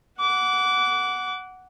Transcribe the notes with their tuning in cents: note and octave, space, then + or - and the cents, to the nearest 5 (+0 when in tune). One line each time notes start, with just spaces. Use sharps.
F#5 +0 D6 -25